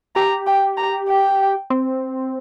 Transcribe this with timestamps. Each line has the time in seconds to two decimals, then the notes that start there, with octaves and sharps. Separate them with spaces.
0.15 G4 A#5
0.46 G5
0.77 A#5
1.09 G5
1.70 C4